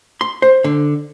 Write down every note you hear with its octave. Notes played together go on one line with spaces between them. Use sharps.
C6
C5
D3